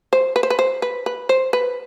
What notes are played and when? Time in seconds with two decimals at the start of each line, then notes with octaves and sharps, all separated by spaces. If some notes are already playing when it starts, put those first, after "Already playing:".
0.13 C5
0.36 B4
0.43 C5
0.50 B4
0.59 C5
0.82 B4
1.06 B4
1.29 C5
1.53 B4